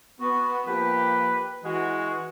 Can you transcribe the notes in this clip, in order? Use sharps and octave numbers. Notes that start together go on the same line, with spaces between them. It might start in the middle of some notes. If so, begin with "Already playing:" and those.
B3 F#4
F3 A#3 G4 B4
E3 G#3 F#4